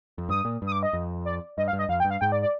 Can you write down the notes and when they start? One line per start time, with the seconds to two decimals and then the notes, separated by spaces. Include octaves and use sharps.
0.18 F2
0.29 G2 D#6
0.45 A#2
0.62 G2
0.67 D#6
0.72 D6
0.83 D#5
0.93 F2
1.25 D5
1.57 G2 D#5
1.68 F5
1.73 G2
1.79 D#5
1.89 F2 F5
2.00 G5
2.05 G2
2.10 F5
2.21 G#2 G5
2.32 D5
2.42 D5